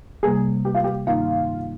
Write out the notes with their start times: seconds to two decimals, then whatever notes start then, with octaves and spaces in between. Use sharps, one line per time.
0.23 C3 G3 A#3 G#4
0.65 G4
0.75 F4
0.84 G4
1.07 G2 D#3 A#3 D#4 F4